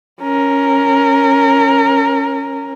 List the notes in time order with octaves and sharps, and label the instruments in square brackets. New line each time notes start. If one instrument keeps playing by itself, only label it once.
[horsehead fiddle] C#4 A#4